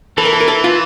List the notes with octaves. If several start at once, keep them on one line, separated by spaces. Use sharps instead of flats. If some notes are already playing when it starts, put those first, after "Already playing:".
E3 A4
A#4
A4
A#4
A4
F4